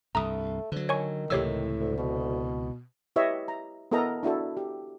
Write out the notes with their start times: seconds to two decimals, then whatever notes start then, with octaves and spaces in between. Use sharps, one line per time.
0.15 C2 G2 A3 A#5 D#6
0.72 D2 D3 F#3
0.89 D#3 C#5 G#5 C#6
1.30 C#2 A2 C3 E3 G4 C#5 E6
1.81 D2
1.98 B2
3.16 E4 G4 B4 C#5 D#5 E5
3.48 A#5
3.92 B3 E4 A4 A#4 D#5 A#5
4.23 D4 E4 F#4 A4
4.57 G4